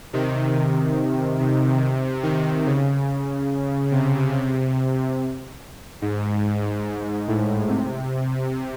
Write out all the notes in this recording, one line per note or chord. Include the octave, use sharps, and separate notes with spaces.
C3 D#3
C3
C3 D#3
C#3
C3
G#2
A2
C3